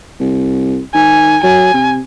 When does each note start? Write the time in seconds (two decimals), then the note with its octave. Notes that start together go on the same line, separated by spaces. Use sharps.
0.20 C2
0.95 D#3 G#5
1.43 F#3 G#5
1.74 C3